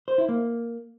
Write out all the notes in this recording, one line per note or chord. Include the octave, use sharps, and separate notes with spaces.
C5
E4
A#3